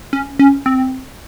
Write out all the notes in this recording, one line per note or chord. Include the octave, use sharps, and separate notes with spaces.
C#4
C#4
C4